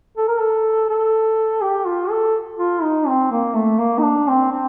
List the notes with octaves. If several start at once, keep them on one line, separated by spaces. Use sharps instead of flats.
A4
A#4
A4
A4
G4
F4
A4
F4
D#4
C4
A#3
A3
A#3
D#4
D4
C4
C4